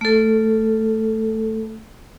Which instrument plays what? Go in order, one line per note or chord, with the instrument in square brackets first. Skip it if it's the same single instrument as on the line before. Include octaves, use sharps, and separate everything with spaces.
[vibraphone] A3 A4